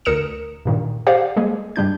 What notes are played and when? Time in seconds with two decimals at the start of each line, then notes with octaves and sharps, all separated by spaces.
0.05 D2 A#4 D#6 C#7 E7
0.65 G2 A#2 D#3
1.07 G4 C5 D5 F5 F#5
1.36 G3 G#3 A#3 G#4
1.76 G2 G3 D4 G6